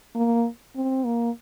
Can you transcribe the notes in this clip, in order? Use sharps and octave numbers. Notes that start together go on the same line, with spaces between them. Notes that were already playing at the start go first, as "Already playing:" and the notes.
A#3
C4
A#3